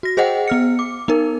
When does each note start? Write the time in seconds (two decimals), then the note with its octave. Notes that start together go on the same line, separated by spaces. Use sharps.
0.03 F#4 A#6
0.17 G#4 C5 D#5 F#5 G5
0.48 B3 F6 C#7
0.79 D6
1.08 B3 D#4 A#4